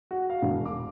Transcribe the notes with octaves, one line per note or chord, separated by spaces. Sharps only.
F#4
F5
E1
D6